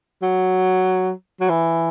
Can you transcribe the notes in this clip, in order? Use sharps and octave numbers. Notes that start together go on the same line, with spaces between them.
F#3
F#3
E3